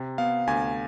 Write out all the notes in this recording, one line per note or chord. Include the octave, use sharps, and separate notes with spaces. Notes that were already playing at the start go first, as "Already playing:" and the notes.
Already playing: C3
B3 F5
D2 G#5